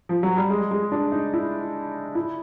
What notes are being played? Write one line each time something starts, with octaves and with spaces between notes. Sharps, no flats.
F3
F#3
G3
G#3
G#3
D4
D#4
E4
E4